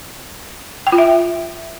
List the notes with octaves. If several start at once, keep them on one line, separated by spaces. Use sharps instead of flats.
G5
F4
E5